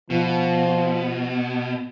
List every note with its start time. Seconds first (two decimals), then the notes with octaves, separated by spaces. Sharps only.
0.10 B2 F3